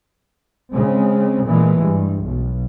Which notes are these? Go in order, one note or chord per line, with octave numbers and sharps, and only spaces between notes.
C#3 G#3 C4
A#2 E3 G#3 A3
G2
B1